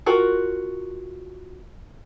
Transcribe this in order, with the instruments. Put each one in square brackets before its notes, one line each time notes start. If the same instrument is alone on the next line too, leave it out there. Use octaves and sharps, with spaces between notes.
[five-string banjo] F4 F#4 A#4